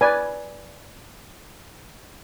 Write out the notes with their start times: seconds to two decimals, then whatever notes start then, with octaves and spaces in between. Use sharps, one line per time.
0.01 B4 D5 G#5